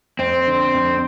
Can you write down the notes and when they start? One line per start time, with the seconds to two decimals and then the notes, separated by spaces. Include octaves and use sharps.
0.19 F2 C4
0.47 D3
0.74 F2